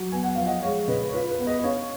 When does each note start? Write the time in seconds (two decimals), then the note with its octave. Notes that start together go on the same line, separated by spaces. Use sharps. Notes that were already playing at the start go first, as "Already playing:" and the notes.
Already playing: F#3
0.12 B3 G#5
0.24 F#5
0.35 F3 F5
0.46 D#5 F#5
0.62 G#3 C#5 F5
0.88 C#3 B4 D#5
1.09 C#5
1.13 F4 B4
1.30 B4
1.38 B3
1.47 B4 D#5
1.59 D#5
1.63 C#4 C#5 F5